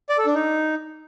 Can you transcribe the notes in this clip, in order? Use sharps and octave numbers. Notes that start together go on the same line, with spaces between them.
D5
A4
D4
D#4